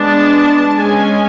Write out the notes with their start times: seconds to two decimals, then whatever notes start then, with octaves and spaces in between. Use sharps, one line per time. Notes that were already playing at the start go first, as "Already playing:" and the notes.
Already playing: G#3 B3 D4 A5
0.77 G#3 C#4 G#5